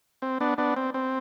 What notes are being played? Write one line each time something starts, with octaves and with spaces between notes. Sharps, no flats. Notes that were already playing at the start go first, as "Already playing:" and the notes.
C4
B3 D4
B3 D4
C4
C4